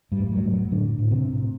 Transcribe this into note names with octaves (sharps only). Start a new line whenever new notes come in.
G2 G3
A2
F#2 F#3
A2
F#2 F#3
A2 D3 D4
A2
C3 C4
A2